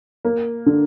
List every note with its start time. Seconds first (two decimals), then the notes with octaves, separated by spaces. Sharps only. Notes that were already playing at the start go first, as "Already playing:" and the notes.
0.25 A#3
0.66 D3